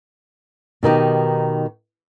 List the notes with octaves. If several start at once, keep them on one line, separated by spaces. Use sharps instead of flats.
B2 D#3 D#4 G4